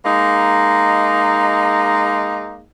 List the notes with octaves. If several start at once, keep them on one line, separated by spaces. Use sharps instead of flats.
G#3 A#3 D#4